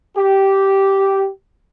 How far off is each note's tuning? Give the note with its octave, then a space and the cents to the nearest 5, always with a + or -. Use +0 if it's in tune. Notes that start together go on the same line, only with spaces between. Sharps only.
G4 -10